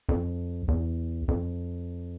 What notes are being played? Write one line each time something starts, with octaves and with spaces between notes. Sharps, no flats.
F2
E2
F2